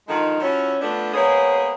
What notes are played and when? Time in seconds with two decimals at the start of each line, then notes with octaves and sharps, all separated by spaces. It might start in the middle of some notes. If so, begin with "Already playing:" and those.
0.08 D3 D#3 F3 G#3 D#4
0.40 F3 C#4 E4 F#4 C#5
0.80 F3 A3 B3 D4
1.14 G#3 A#3 B3 G#4 C5 C#5